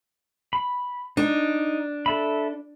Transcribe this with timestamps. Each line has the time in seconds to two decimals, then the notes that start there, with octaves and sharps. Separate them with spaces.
0.53 B5
1.17 D4 D#4
2.06 A4 E5 B5